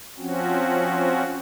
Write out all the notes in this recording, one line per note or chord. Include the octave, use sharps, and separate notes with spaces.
F3 C4 C#4 F#4